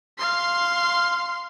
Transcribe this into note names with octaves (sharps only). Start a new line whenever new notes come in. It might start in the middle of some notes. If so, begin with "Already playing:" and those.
F5 C6